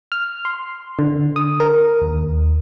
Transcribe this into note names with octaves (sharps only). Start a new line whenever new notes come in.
F6
C6
D3
D#6
A#4
D#2